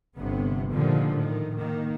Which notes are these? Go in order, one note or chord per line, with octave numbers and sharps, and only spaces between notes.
G1 C3 B3
A#2 D3 D#3 F3 G3
A2 D#3
D#3 A#3